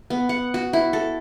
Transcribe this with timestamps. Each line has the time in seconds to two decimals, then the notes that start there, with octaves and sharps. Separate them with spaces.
0.10 B3
0.29 F#5
0.54 F#4
0.73 E4
0.93 A4